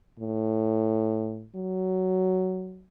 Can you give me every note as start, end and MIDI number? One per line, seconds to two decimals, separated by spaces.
0.20 1.46 45
1.56 2.85 54